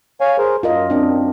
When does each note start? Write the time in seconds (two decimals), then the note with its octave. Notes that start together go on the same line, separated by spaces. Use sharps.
0.21 C#5 F5 G#5
0.38 G#4 A#4 C5
0.63 F#2 F4 A#4 D#5
0.90 C4 D4